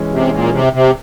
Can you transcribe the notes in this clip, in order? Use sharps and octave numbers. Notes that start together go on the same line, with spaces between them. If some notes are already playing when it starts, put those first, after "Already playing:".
Already playing: E3 G#3 C#4
C3
A#2
C3
C3